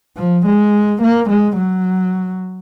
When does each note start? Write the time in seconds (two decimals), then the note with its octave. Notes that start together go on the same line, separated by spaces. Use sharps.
0.17 F3
0.45 G#3
1.01 A#3
1.29 G#3
1.57 F#3